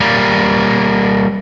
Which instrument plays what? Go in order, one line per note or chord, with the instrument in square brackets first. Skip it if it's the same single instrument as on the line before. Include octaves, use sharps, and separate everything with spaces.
[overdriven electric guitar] G3 A#3